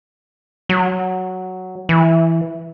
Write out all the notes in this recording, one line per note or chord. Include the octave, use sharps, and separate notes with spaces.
F#3
E3